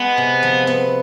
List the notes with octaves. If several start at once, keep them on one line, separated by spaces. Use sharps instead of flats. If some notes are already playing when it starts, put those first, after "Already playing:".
Already playing: G#3 B3 B4
C3
F3
B3